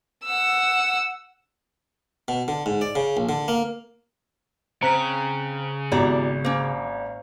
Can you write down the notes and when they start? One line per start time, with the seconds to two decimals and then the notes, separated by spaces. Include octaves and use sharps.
0.25 F#5 E6
2.28 B2
2.48 D3
2.66 G#2
2.81 D5
2.95 C#3
3.17 A#1
3.29 D3
3.48 A#3
4.82 C#3 C4 A#5 F#6 B6
5.92 G#1 B3 E4 F#4 G4 D5 A#5
6.45 A#3 C#4 C5